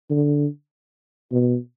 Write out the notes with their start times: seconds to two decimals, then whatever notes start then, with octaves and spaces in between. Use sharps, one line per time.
0.10 D3
1.32 B2